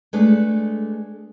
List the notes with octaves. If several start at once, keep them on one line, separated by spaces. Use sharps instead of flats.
G#3 A3 D4 G#4 B4 C#5